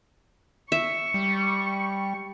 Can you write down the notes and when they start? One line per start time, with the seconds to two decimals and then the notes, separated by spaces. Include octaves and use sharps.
0.72 E5 C#6
1.14 G3